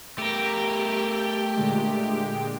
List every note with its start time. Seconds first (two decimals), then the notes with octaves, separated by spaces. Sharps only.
0.18 A3 G4 A#4
1.56 A#2 D3 G#3